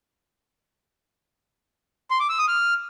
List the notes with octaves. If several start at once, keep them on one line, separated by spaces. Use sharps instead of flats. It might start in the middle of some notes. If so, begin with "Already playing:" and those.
C6
D6
E6
D#6
F6